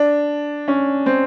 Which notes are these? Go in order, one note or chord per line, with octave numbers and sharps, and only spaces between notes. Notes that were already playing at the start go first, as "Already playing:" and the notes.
Already playing: D4
C#4
C4